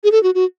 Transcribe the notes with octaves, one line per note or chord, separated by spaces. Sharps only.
G#4
A4
F#4
F#4